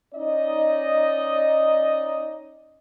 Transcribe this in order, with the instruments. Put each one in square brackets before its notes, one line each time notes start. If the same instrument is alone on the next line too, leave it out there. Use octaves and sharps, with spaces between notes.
[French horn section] C#4 D#4 D5 D#5